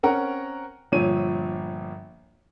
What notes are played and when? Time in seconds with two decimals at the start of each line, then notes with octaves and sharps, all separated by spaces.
0.03 C4 C#4 A#4 F#5 A#5
0.92 G1 A#2 F3 C#5 D#7